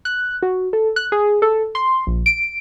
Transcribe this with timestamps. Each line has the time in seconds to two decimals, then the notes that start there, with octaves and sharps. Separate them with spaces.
0.05 F#6
0.43 F#4
0.73 A4
0.96 F#6
1.12 G#4
1.42 A4
1.75 C6
2.07 A#1
2.26 D7